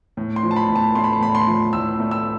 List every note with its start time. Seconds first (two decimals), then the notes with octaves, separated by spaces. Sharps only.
0.17 A2
0.36 C6
0.43 F3
0.51 A5
0.56 B5
0.69 A2
0.76 A5
0.95 A3 C6
1.04 B5
1.13 A5
1.21 A2 B5
1.35 C6
1.47 F3
1.73 A2 E6
2.00 A3
2.11 E6